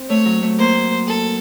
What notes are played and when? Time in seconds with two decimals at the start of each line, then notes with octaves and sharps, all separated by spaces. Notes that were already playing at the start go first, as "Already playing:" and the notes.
Already playing: C4
0.09 A3 C#5
0.25 F#3
0.42 A3
0.58 A#3 C5
1.07 A4